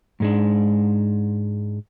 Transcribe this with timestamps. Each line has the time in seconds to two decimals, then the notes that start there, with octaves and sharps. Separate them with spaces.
0.20 G#2 G#3 D4